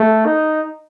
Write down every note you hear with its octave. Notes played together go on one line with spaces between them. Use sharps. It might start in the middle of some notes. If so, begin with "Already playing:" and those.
Already playing: A3
D#4